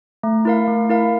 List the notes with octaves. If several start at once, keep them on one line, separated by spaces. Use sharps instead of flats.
A3
E4 A#4 F5
A3
E4 A#4 F5